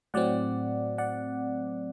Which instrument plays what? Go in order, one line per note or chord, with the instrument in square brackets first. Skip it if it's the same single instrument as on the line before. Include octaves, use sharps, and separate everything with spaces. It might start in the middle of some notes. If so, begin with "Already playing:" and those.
[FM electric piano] A2 F#3 C4 D5 F#5
D5 F#5